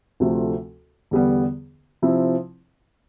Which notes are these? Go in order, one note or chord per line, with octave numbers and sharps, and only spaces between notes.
D2 C3 F3 A3
E2 D3 G3 B3
C3 F3 C4 E4